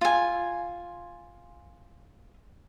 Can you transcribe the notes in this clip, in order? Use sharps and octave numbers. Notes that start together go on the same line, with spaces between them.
F4 G#5